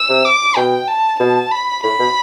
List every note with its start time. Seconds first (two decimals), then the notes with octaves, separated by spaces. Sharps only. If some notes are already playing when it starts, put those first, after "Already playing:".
Already playing: E6
0.09 C3
0.25 D6
0.56 B2 G5
0.88 A5
1.19 B2 A5
1.51 B5
1.83 A2 B5
1.99 B2